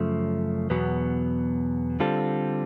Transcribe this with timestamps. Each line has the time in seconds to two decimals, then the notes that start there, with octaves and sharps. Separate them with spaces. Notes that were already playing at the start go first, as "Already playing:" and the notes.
Already playing: F#2 C#3 F3 A3
0.70 E2 B2 F#3 B3
2.00 D3 G3 C4 F4 A4